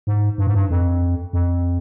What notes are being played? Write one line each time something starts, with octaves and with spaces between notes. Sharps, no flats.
G#2
G2
G#2
G2
F2
F2